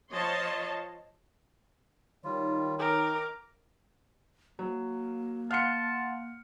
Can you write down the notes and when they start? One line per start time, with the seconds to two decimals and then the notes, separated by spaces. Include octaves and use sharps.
0.12 F3 C#5 D#5 A5 C6
2.24 D#3 G3 F4 C#5
2.79 D#4 A#4 G5 D6
4.59 F#3 A#3
5.51 F5 F#5 A5 C6 F6 C#7